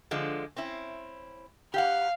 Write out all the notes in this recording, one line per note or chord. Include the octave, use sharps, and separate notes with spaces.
D3 F3 G#3
C4 C#4 E4
G4 F5 F#5